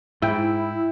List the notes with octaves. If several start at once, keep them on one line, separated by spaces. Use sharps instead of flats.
G#2 E4 E5 G5